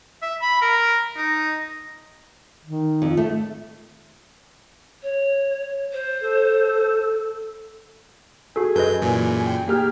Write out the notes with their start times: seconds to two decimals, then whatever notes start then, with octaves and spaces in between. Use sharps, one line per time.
0.22 E5
0.41 B5
0.61 A#4
1.17 D#4
2.65 D#3
3.02 F2
3.17 A3
5.02 C#5
5.92 C5
6.21 A4
8.56 F#4 G#4 A4 G#5
8.76 F#2 A4 B4 D#5 G6
9.02 F#2 A#2 E3
9.45 G5
9.67 A#3 G4 G#4 F6